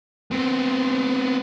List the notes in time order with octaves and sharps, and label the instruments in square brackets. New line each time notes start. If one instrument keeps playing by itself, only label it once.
[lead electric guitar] B3 C4